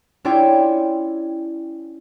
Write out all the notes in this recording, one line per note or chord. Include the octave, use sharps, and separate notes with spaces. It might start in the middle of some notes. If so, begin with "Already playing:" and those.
C#4 E4 F4 C#5 D5 G5